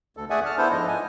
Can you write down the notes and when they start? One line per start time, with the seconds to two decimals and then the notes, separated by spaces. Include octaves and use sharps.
0.17 D2 A4
0.30 A3 G#4 D5 E5 F#5 G#5
0.45 A5 F6
0.58 B3 D4 E4 A4 C5
0.71 G#2 F3 D#5
0.88 G#5